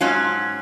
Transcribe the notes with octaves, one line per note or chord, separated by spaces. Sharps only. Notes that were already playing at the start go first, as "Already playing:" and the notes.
G#2 F#3 C#4 F4